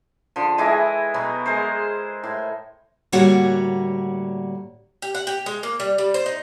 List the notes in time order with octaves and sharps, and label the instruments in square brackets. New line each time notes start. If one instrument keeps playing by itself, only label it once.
[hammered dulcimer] D3 F3
E3 G#3 E4 D#5
B2 F#3 B3
G#3 G#4 A#4 C5
A2
[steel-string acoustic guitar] A2 D3 G3 A#3 F#4 C#5
[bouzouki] G4
F#5
G4
G#3
A#3
G3
G3
C5
D#4